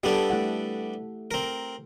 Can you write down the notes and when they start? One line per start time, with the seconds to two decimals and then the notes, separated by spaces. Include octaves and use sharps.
0.03 G3 B3 D4 G4 A4
0.30 A3 E4 F#5
1.31 C4 A#4